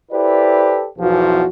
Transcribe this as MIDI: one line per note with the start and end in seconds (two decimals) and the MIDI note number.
0.12 0.86 64
0.12 0.86 67
0.12 0.86 69
0.12 0.86 71
0.12 0.86 72
0.12 0.86 74
0.98 1.45 35
0.98 1.45 40
0.98 1.45 52
0.98 1.45 53
0.98 1.45 65
0.98 1.45 66